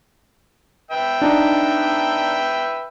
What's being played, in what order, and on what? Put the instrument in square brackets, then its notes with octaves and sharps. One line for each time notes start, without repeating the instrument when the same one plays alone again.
[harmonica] B4 E5 G5
[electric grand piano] D4 D#4